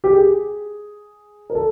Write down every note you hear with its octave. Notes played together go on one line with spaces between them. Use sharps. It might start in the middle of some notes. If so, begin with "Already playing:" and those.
G4
G#4
A#4
A4